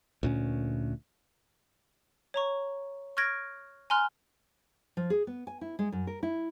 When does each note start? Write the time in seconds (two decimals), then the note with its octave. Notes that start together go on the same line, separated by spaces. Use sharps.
0.23 D2 A#2 C#4
2.34 C#5 A#5 C#6
3.17 C#6 F6 F#6 G#6 A#6 D7
3.90 G#5 A#5 C6 F6 F#6
4.97 F3
5.10 G#4
5.27 B3
5.47 G#5
5.61 E4
5.79 G#3
5.92 F#2
6.07 A#4
6.23 E4